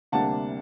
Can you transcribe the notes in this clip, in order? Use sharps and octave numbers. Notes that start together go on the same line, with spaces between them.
D2 C3 G3 A#3 D4 F#5 A5